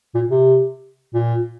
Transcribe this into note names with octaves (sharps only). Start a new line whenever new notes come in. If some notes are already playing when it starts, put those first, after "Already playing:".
A#2
C3
A#2